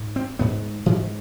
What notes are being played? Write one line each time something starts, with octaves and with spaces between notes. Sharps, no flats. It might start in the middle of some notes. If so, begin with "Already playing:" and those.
Already playing: G#2
C4
G#2 B3
G#2 E3